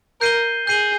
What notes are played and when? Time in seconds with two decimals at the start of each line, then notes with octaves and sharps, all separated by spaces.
0.21 A#4 G6 C7 D#7 G7
0.67 G#4 G6 C7 D#7 G7